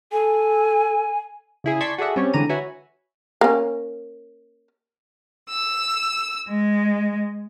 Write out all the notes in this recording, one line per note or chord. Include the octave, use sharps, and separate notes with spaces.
A4 G#5
C#3 E4 G#4
D5 A5 C6 C#6 G#6 B6
F#4 G#4 A4 D5 E5 F#5
G3 C4 C#4 C#5
D3 E3 G#3 G4 A#5 D#7
F#4 B4 C#5 E5 G#5
A#3 C#4
E6
G#3